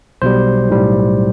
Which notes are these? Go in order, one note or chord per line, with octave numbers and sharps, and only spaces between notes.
B1 B2 G3 C5
B1 A2 G3